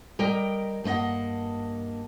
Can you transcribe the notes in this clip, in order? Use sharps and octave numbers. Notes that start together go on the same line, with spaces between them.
G3 A#4 D#5 G5 A#5
G2 A#3 D#4 D#5 F#5